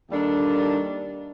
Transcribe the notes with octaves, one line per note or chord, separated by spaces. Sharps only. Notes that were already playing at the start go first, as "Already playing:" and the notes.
D#2 D#3 G3 D4 A4